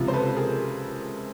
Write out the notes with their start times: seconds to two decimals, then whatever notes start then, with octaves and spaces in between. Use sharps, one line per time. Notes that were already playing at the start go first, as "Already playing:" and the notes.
Already playing: C#2 C3 F3
0.08 C5
0.13 A4 B4
0.36 G#4 A#4